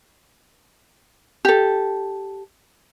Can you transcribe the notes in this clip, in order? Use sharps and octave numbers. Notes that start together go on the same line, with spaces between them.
G4 A4